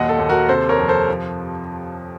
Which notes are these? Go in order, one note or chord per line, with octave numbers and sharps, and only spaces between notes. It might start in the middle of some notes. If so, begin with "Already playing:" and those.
Already playing: D#2 A#2 F#3 D#5 F#5
A4
D#2
F#4 A#4
C3 A4 C5
A#4 C#5
F2
A4 C5
F3